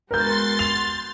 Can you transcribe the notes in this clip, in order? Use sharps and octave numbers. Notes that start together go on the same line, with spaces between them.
G#3 B3 F#4 A#4 C6 G6 A6 C7
F7